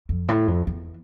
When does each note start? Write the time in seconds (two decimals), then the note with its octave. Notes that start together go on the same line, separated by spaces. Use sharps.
0.09 F2
0.28 A2
0.48 F2
0.67 E2